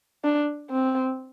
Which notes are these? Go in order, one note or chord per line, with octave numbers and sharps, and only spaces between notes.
D4
C4